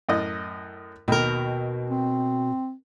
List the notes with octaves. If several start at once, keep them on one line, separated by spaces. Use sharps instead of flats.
F#2 A2 D#5
D#2 B2 A#4
C4